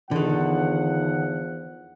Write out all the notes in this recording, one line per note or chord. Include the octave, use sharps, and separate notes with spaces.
E2 D3 D#3 F3 F#5